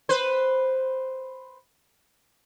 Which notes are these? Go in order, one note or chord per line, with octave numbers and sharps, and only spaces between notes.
B4 C5